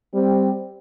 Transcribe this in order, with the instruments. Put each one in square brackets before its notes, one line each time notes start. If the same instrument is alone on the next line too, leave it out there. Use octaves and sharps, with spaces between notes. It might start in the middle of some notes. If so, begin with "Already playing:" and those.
[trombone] G3 [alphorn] C4